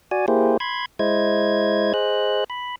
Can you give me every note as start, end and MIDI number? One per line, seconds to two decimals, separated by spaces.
0.11 0.26 66
0.11 0.26 74
0.11 0.26 80
0.28 0.57 58
0.28 0.57 64
0.28 0.57 67
0.28 0.57 68
0.28 0.57 72
0.60 0.86 83
0.60 0.86 84
0.60 0.86 92
0.99 1.93 56
0.99 1.93 64
0.99 1.93 72
0.99 1.93 75
0.99 1.93 92
1.94 2.44 68
1.94 2.44 72
1.94 2.44 75
1.94 2.44 90
2.50 2.76 83